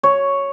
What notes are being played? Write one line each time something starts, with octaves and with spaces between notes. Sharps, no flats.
C#5